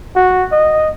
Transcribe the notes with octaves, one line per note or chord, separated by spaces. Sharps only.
F#4
D#5